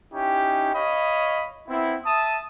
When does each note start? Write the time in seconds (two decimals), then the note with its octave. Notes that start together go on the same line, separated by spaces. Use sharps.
0.13 C#4 D#4 E4 G4
0.74 C#5 D#5 F5 B5
1.68 B3 C4 E4
2.06 E5 A5 D#6